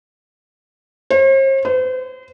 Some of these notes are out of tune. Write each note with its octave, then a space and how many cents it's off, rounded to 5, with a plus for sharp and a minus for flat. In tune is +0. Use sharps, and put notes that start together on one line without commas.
C5 +45
C5 -40